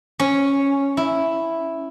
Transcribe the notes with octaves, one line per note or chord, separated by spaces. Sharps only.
C#4
E4